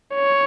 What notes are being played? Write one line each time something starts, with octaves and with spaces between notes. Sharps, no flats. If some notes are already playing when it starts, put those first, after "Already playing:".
C#5